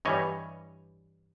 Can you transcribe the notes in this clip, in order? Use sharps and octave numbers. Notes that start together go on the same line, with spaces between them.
G2 E3 G3 C#5 D#5